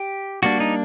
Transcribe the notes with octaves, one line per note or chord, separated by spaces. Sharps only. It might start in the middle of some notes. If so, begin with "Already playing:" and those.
Already playing: G4
G3 A#3 D4 F#4
D#4